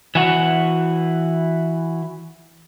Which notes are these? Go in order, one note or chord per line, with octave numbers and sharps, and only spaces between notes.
E3 F#4